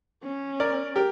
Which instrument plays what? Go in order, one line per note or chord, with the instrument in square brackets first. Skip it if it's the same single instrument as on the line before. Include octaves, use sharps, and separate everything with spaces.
[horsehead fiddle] C#4
[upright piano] A#4 D5
G4 A#4